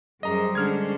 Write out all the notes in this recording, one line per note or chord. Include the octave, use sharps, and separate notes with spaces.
F#2 G3 G#4 C5 D#5 A#5
D3 G#3 C#4 D4 F6 G#6